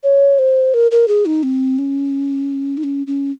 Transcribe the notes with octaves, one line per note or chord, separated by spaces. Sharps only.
C#5
C5
A#4
A#4
G#4
D#4
C4
C#4
D#4
C#4
C#4